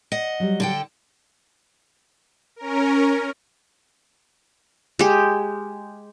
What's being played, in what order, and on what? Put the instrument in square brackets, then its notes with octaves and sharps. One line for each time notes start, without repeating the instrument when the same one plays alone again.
[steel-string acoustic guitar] D#5 F#5
[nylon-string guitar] F#3 G3
[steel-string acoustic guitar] D3 A4 G5
[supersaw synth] C#4 A#4
[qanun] G#3 G4